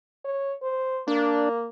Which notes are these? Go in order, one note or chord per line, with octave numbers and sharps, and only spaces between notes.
C#5
C5
A#3 D4